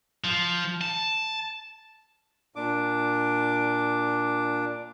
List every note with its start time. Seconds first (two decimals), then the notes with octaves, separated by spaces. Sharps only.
0.24 F3
0.81 A5
2.56 A#2 D4 D6